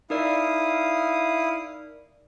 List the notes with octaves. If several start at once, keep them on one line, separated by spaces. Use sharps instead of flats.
D#4 E4 A#4 D5 F5 D#6